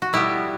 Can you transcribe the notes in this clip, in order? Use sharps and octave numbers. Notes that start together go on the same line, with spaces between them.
F#4
B2 G3 B3 E4